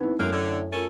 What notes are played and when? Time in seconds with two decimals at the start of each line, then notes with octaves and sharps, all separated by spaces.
0.01 B3 C4 D#4 E4
0.19 F#2 A2 G#3 A#3 F6 F#6 D7
0.32 D3 G#6
0.72 A3 C#4 F4 A4 A#4 A6